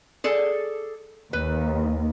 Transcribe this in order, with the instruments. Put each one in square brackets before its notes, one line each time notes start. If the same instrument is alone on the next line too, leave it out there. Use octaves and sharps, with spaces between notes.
[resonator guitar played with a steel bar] G#4 A4 D5
[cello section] D#2 [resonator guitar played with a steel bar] B4